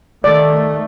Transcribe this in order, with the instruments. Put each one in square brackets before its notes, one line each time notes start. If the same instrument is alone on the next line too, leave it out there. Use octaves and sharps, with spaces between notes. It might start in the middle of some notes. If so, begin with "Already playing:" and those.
[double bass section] D#3 A3 [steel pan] D5